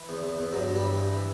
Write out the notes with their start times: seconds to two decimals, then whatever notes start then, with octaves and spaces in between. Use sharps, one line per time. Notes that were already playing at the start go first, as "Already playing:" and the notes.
Already playing: E3
0.09 E2
0.23 E2
0.39 E2
0.53 G2 F#3
0.68 G2
0.75 G3
0.82 E3
0.97 G2
1.13 E3